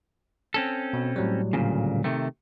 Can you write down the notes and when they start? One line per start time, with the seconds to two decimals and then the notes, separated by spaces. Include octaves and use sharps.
0.54 C4 C#4 A4
0.93 B2
1.16 A2 F#3 G3
1.53 D2 A#2 C#3
2.04 C3 D#3 A3